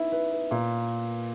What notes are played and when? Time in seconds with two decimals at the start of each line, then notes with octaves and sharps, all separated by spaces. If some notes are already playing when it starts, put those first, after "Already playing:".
Already playing: D#4 E4 B4
0.12 B4
0.32 B4
0.51 A#2